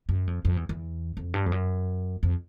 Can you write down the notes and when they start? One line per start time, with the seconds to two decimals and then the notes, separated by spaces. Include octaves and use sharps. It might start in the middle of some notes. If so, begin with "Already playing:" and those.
0.09 F#2
0.27 F2
0.45 F2
0.57 E2
0.69 E2
1.17 F2
1.34 G2
1.46 F2
1.52 F#2
2.23 F2